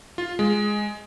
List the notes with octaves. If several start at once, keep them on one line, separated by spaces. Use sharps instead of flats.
F4
G#3